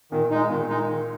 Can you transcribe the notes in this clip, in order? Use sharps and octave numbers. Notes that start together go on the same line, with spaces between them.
A#2 D#3
G#3 D#4
A#2 D#3
G#3 D#4
D#3